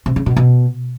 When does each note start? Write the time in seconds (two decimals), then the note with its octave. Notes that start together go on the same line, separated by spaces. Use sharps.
0.06 C3
0.16 C#3
0.26 B2
0.36 B2